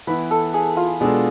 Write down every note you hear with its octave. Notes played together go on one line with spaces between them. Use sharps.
E3 B3 E4 B4
A4
G#4
F4
B2 G#3 D4 G#4 A4